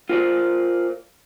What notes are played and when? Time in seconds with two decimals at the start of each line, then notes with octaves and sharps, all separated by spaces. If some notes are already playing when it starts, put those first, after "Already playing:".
0.09 F4 A#4 C5 D5